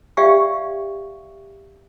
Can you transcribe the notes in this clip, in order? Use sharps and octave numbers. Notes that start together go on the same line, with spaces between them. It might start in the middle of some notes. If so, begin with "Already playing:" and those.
G4 D5 E5 F5 G5 C#6